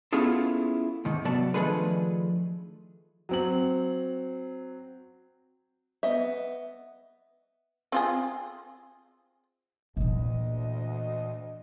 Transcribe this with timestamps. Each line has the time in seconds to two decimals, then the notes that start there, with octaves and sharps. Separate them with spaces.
0.13 B3 C#4 E4 F4 G#4 A4
1.05 D#2 G#2 D#3
1.25 C3 F#3 B3 D5 A5
1.54 D#3 F3 A3 D4 G#4 B4
3.29 F#3 C4 F#7
6.03 B3 D#5 E5
7.92 C4 F4 G#4
9.97 D2 A#2 E3 D#5